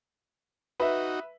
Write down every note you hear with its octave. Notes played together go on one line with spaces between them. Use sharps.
D#4 F#4 B4 E5